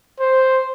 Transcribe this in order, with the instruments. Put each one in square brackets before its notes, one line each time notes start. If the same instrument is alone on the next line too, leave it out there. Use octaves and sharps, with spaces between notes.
[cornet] C5